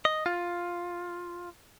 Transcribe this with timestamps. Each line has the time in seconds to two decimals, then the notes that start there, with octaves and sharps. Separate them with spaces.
0.05 D#5
0.26 F4